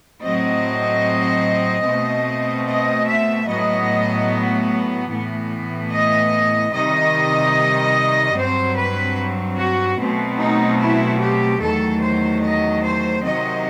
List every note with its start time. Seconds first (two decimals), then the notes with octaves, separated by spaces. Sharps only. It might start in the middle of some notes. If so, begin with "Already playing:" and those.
0.20 A2 F#3 C4 D#5
1.83 B2 A3 C4
2.65 D#5
3.06 E5
3.46 A2 F#3 B3 D#5
5.09 A2 E3 B3
5.91 D#5
6.71 C3 D#3 G3 D#5
8.35 G2 F#3 C4 C5
8.75 B4
9.57 F#4
9.98 B2 F#3 A3 C4
10.37 D#4
10.78 E4
11.20 G4
11.60 E2 D#3 F#3 A3 A4
12.00 C5
12.42 D#5
12.82 C5
13.22 C3 D#3 F#3 C4 D#5